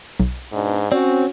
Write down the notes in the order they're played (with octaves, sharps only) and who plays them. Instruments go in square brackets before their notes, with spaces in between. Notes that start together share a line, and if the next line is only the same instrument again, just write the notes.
[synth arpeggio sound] B1
[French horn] G#2 [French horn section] B2 D4
[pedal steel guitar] C4 [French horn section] C#4 [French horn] F#4 [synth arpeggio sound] D5